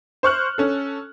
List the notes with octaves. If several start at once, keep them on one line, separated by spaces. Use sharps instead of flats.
C5 C#6 F6 F#6
C#4 A4